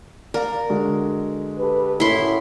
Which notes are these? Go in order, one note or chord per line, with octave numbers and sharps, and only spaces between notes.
A#4 D5 F5
D3 G#3 F#4
G4 A4 B4
F#2 A2 E4 C6